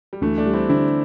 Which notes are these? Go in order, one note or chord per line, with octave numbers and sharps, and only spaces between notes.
G3
D2 E3 A3
A3 D4
G3
C4 E4
D3 C4 E4